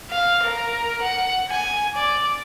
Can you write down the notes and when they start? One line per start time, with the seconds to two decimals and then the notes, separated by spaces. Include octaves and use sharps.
0.11 F5
0.43 A#4
1.02 F#5
1.50 G#5
1.95 D5